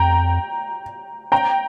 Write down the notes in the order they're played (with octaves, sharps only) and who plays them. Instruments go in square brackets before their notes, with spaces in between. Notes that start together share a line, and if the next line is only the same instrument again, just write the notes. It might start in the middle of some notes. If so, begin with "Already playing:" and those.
Already playing: [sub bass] F2 [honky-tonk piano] G5 A#5
[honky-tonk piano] G5 A#5